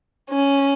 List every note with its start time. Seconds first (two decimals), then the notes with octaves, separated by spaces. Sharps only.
0.30 C#4